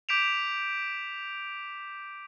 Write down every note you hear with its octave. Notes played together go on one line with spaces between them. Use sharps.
D6 G6 B6 D7 E7 F7